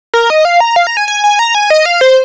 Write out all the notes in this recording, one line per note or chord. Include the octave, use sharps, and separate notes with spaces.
A#4
D#5
F5
A#5
F5
A#5
G#5
G#5
G#5
A#5
G#5
D#5
F5
C5